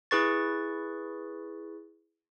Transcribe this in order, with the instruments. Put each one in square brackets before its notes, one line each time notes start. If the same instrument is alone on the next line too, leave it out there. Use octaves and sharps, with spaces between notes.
[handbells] E4 G#4 B4 C#6 A6